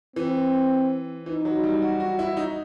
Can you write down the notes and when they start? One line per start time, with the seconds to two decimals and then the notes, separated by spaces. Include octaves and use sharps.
0.16 E3 C4
1.26 E3 D#4
1.45 F#3
1.63 G3
1.82 F#4
2.00 F#4
2.19 E4
2.37 D#4